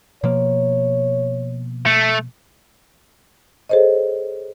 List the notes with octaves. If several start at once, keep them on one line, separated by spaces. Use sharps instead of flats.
B2 F3 A#3 C#5
A3
G#4 A4 C5 C#5 D#5